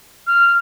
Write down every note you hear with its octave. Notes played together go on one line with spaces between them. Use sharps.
F6